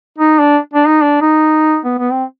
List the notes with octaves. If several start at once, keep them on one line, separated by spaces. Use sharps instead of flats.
D#4
D4
D4
D#4
D4
D#4
B3
B3
C4